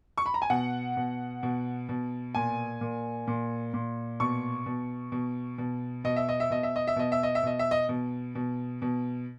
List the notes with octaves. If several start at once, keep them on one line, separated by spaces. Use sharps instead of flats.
C#6
B5
A#5
G#5
B2 F#5
B2
B2
B2
A#2 G#5
A#2
A#2
A#2
B2 C#6
B2
B2
B2
B2 D#5
E5
D#5
E5
B2 D#5
E5
D#5
E5
B2 D#5
E5
D#5
E5
B2 D#5
E5
D#5
B2
B2
B2